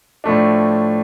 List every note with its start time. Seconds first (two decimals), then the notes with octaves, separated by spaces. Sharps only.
0.24 A2 F3 A3 D4